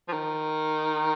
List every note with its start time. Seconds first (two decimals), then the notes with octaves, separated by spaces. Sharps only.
0.09 F3
0.13 D#3